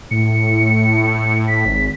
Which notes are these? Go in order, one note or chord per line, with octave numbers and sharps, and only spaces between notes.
A2 C#7
B6
G#1